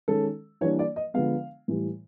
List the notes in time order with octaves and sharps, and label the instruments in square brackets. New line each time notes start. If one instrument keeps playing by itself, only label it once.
[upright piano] D#3 G#3 C#4 A4
E3 G3 A#3 D4 C#5
D5
D#5
D3 F3 G#3 B3 F5
A2 E3 G3